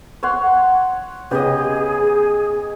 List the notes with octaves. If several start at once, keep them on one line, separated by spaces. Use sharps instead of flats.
C#5 F#5 C6
C#3 B3 G4 G#4 D#5